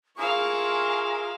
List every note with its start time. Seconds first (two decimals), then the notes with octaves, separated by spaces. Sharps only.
0.18 E4 F4 G#4 A#4 F5 G#5 C#6